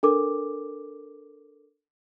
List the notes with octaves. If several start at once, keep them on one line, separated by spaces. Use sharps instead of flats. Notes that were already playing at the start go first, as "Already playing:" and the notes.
D4 A4 A#4 D6